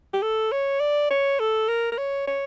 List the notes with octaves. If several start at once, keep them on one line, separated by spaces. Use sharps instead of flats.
G4
A4
C#5
D5
C#5
A4
A#4
A#4
C#5
C#5